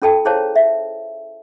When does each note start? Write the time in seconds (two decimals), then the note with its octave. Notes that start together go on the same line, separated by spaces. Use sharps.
0.02 C#4 F4 A4 G5 A5
0.25 E4 G#4 C5 C#5 F5 A5
0.56 E5